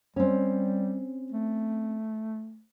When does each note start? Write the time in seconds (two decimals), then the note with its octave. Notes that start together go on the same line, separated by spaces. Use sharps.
0.16 G3 C4 C#4
1.32 A3